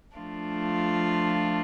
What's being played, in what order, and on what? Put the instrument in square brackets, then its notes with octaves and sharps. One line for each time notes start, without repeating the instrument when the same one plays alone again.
[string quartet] F3 A3 D4 F4